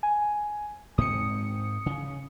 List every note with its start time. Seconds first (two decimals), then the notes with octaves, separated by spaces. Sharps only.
0.03 G#5
0.98 G#2 C4 D#6 C#7
1.86 C#3